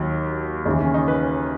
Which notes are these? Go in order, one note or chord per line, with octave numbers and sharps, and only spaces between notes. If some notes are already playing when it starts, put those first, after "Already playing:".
Already playing: D#2 D#3 F#3
D#2 C#3 E3 D#4
C#4
D#4
B4